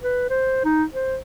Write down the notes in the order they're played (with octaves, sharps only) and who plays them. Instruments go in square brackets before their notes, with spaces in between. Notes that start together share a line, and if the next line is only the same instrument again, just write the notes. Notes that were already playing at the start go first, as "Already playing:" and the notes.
[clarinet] B4
C5
D#4
C5